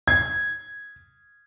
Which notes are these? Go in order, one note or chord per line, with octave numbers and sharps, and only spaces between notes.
G#6